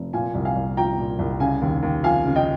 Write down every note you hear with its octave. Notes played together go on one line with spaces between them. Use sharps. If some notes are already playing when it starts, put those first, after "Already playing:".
Already playing: F1
A#2 F5 G#5
C2
F5 G#5
C2
F3 G5 A#5
A#2
C2
C#3 F5 G#5
D#2
D#2
F3 F5 G#5
C#3
D#5 G5